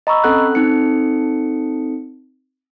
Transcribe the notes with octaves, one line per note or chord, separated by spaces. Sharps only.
D#5 A#5 B5 C#6 E6
C4 C#4 A4 F#5 F#6
C4 D#4 A4 C#7